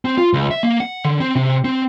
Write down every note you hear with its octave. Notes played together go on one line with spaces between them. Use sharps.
C4
F4
C#2
E5
A#3
F#5
D3
C4
C3
C4